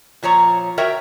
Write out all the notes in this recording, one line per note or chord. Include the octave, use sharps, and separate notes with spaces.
A#2 F3 C#5 A#5
F#4 A#4 C#5 E5 G5